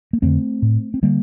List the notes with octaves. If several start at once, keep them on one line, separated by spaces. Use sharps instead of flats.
A#3
F2 D3 A3 C4
A2
C4
D3 G3 A#3